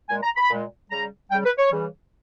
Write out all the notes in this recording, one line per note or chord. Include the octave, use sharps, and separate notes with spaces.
A#2 G#3 G#5
A#5
B5
A#2 G#3
C#3 G3 A#5
C#3 G3 G5
B4
C#5
C#3 E3 G3